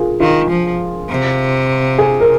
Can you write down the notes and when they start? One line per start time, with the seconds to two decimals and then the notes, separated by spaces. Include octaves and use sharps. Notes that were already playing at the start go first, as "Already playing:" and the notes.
Already playing: F4 G#4 A#4
0.20 D#3 F4
0.50 F3
1.10 C3
1.99 G#4
2.20 A#4